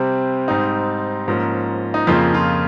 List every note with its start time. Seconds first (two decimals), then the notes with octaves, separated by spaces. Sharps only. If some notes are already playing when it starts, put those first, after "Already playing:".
Already playing: C3 G3 C4
0.48 G#2 G3 C4 D#4
1.28 G#2 F3 A#3 C#4
1.94 D#4
2.07 F2 C#3 F3 A#3 F4
2.34 F4